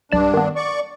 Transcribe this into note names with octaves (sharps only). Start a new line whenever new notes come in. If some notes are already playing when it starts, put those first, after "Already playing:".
B1 G2 D4 D5 E7
D#3 B3
D5 C#6